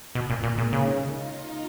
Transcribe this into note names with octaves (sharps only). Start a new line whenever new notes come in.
B2 A#3 C4
A#2
A#2 G#3 A#3
A#2
C#3 C#4 D#4
D#4 F4